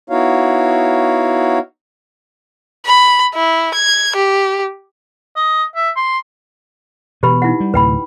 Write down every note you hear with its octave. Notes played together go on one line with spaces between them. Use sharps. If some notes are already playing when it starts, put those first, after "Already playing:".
B3 D#4 E4 F#4 C#5 F5
B5
E4
G#6
G4
D#5
E5
C6
B2 E3 B3 G4 B4 B5
D#4 E4 F#5
G3
D2 A2 C3 B4 G5 B5